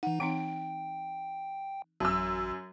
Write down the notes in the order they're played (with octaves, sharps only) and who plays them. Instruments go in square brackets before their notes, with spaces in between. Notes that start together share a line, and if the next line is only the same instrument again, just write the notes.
[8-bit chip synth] E3 D#4 [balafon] F#5
[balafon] E3 C4 D#4 [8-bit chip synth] G5 [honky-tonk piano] D7
[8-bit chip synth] A1 [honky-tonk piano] F#2 E6 [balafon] F#3